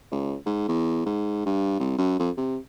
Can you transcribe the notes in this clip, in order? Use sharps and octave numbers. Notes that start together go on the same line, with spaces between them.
C#2
G#2
E2
G#2
G2
C2
F#2
F2
C3